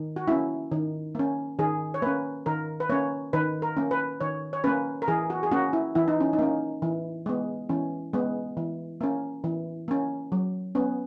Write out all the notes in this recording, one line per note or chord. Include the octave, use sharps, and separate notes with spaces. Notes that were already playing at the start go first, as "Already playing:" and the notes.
Already playing: D#3
F#4
A#3 C#4 E4
D#3
A#3 C#4
D#3 G#4
C#5
A#3 C#4 B4
D#3 A#4
B4
A#3 C#4 C#5
D#3 B4
A#4
A#3 C#4
B4
D#3 C#5
C#5
A#3 C#4 B4
A#4
E3 G#4
F#4
G#4
A#3 C#4 F#4
E4
E3 E4
D#4
C#4
D#4
A#3 C#4
E3
G#3 B3
E3 C#4
G#3 B3
E3
A#3 C#4
E3
A#3 C#4
F#3
B3 C#4